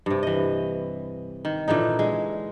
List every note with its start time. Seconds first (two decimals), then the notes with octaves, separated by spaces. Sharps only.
0.06 G2 C3
0.23 E3 D#5
1.45 D#3
1.68 A#2 D3 E3 D#4
1.99 G#3